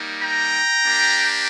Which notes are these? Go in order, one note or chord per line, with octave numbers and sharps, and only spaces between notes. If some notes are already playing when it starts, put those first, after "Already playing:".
Already playing: G3 A#3 D#4
G5 A#5
A#3 D4 G4